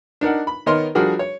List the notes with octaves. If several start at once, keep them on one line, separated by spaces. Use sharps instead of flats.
D4 D#4 A#4 F#5
B5
D#3 B3 A#4 C#5 D#5 C6
F3 G3 D4 F#4 G#4 A#4
C#5